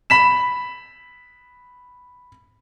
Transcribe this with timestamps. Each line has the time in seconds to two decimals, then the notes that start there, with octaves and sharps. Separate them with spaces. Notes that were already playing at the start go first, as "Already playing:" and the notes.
0.10 B5 B6 E7